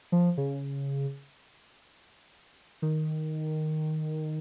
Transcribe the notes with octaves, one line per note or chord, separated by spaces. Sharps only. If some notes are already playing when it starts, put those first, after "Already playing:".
F3
C#3
D#3